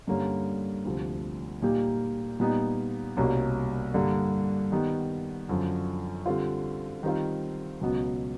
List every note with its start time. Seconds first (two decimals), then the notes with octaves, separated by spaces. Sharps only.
0.07 G2 D3 G3 A#3 C#4
0.85 D2 C3 F3
1.62 A#2 G3 A#3 D#4 G4
2.40 A#2 G3 B3 D#4
3.17 C2 B2 G3 A#3 C#4
3.94 G2 D3 G3 A#3
4.72 D#3 G3 B3
5.49 F#2 D3 F3
6.26 D3 G3 C4 F4
7.03 D#3 G3 C4 F4
7.81 C#2 B2 F#3 B3